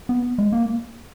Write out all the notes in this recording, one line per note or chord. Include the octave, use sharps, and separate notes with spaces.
B3
G#3
A#3